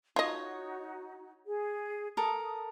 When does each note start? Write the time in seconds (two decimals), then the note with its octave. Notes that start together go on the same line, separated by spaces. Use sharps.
0.16 D#4 F4 F#4 C#5 D#5
1.47 G#4
2.17 A4 A#4 D#6